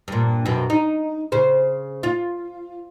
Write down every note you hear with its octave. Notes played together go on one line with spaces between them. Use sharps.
G2 A#2
F#2 B2
D#4
C#3 C5
F4